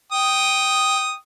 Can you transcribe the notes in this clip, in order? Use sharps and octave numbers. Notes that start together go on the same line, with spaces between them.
G5 D#6